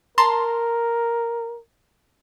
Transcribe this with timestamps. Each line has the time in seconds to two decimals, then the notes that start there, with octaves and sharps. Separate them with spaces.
0.18 A#4 A5 A#5 C6